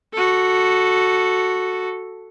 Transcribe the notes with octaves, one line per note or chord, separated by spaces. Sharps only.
F#4 A4